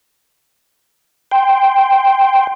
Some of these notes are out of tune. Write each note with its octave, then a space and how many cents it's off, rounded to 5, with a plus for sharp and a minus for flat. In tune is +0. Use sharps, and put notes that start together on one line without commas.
G5 +0 C6 +0